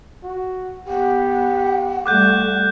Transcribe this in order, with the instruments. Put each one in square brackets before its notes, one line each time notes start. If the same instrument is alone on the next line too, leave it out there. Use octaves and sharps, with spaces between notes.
[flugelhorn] F#4
[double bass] B3 [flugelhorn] G4 [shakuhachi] F#5
[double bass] G3 A3 [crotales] D6 F#6 G6